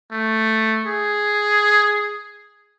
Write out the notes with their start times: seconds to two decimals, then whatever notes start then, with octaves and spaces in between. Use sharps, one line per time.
0.11 A3
0.87 G#4